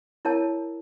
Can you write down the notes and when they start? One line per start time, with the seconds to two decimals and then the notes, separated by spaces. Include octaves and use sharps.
0.25 E4 A#4 C#5 A5